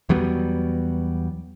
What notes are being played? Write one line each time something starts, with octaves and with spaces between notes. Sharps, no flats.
E2 F#3 G3 B3